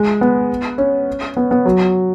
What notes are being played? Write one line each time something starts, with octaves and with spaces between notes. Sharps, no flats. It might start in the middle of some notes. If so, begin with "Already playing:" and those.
Already playing: G#3
B3
C#4
B3
B3
F#3